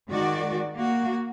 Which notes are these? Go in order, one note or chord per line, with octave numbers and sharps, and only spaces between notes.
D#3 G#3 F#4 D5
A#3 F#4